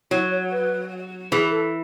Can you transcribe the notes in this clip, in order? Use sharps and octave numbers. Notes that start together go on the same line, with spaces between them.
F#3 E4
C#5
B4
E3 G#4
A4